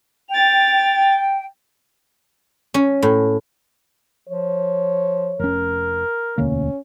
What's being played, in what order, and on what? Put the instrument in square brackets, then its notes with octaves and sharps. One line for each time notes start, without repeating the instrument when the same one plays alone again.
[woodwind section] G5 [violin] A6 F7
[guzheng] C#4
A2
[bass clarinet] F3 [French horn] C#5
[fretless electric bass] F1 C#4 [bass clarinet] A#4
[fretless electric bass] E1 D2 A#3 [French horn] C#4